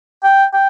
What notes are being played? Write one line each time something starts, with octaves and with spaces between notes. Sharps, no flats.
G5
G5